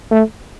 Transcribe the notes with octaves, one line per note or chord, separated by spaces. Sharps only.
A3